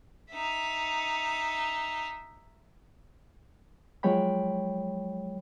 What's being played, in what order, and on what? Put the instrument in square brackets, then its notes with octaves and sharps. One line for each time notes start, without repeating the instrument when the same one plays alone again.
[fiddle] D#4 E5
[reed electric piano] F3 F#3 G#3 C#5 G5 B5